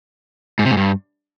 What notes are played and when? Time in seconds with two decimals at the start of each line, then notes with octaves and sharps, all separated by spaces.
0.59 G#2
0.65 C3
0.71 G#2
0.77 G2